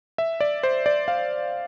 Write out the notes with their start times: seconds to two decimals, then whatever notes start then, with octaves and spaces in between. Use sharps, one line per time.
0.18 E5
0.40 D5
0.63 C5
0.86 D5
1.08 F5